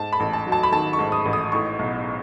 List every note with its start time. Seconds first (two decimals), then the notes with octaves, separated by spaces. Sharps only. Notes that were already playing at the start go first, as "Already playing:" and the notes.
Already playing: G#2 A5
0.12 B5
0.20 A1
0.33 A5
0.47 F#3
0.52 A5
0.63 B5
0.72 D#3 A5
0.93 C#6
0.99 G#2
1.12 D#6
1.26 A1
1.33 D#6
1.52 A2 C#6
1.79 B1